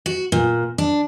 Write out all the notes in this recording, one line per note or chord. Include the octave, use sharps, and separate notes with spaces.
F#4
A#2
D4